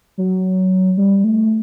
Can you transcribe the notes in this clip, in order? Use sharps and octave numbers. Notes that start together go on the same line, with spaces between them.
F#3
G3
A3